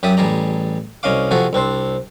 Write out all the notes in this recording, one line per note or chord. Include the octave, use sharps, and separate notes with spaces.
F#2 G4 D5 E5 D#6
A1 G3 G#4 D5 A#5
C2 C#4 D#5 F5 D6
C3 F3 F#4 G#4 A4
C2 C4 D4 C5